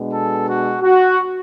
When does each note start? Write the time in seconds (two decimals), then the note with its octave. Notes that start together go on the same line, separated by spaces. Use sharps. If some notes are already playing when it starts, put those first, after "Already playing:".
Already playing: B2 G#3 B3 D4
0.12 A4
0.48 F#4
0.82 F#4